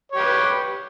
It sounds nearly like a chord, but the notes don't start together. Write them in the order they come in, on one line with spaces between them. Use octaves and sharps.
C#5 G4 B4